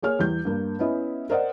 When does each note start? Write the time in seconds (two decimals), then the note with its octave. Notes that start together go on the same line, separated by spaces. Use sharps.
0.03 A#3 G#4 C#5 F6
0.19 E2 G3 G6
0.45 G2 A#3
0.79 B3 C#4 E4 D#5 E5
1.30 A#4 C5 D5 D#5 F#5